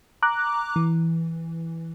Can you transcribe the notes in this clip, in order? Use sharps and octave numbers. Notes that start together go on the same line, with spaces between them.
A#5 D6 F#6
E3